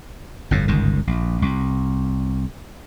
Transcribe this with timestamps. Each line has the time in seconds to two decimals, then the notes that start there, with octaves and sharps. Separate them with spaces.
0.51 G1 F2 A2
0.68 G1 C#2 G#2 D#3
1.07 A#1
1.42 C2